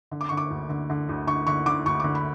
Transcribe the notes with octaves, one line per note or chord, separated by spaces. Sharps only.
D3
D6
D3 C#6
D6
D2
D3
D3
D2
D3 C#6
D3 C#6
D3 D6
D2 C#6
D6
D3
B5